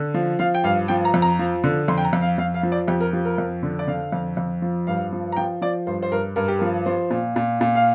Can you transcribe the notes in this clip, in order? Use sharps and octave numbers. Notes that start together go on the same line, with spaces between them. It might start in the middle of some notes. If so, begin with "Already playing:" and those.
Already playing: D3
F3
F3 F5
G5
G2 F5
F3 G5
A#5
F2
A#5
F3
D3
F2 C6
G5
A#5
F2
F5
F2 F5
F5
F3
D5
F2 G4
A#4
F3 G4
A#4
F2
D3
D5
D3 F5
F2
F2
F3
G2 F5
F3
A#5
F3 G5
F3 D5
G2 C5
C5
G2 A#4
G2 A#4
G4
F3 A#4
F3 C5
A#2
A#2
A#2
F5